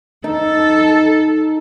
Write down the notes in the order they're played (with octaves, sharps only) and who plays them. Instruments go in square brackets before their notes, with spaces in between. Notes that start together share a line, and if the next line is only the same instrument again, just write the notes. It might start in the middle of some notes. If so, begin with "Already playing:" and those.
[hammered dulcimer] D#4 [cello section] A4